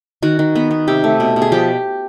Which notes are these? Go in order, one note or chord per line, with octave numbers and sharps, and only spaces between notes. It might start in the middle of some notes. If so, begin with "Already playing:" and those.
D#3 F#4
D#3
B3
B3
C3 G4
A3
B2
B2
G#4
F3 G4